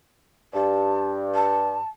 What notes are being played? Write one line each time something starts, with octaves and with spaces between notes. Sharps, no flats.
G2 A5
A5